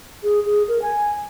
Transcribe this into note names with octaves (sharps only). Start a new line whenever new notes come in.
G#4
G#4
A#4
G#5